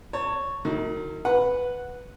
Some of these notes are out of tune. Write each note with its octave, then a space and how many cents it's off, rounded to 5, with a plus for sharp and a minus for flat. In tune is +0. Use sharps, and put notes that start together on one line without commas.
C#5 +0 A5 +30
D#3 -30 F#3 +0 D#4 +45
B4 +0 F#5 -5